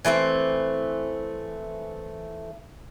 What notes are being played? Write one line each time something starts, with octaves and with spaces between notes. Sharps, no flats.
E3 A3 B3 C4